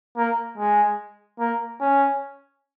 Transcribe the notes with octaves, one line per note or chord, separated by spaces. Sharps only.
A#3
G#3
A#3
C#4